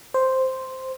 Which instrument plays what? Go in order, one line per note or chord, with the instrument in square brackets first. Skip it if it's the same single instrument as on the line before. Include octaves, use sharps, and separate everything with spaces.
[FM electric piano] C5